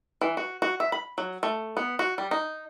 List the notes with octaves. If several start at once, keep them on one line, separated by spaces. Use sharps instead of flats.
E3
F#4
F#4
E5
B5
F#3
A3
B3
F#4
G3
D#4